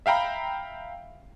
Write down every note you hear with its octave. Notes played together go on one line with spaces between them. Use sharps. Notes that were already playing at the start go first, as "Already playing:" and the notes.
E5 F5 G5 A#5 B5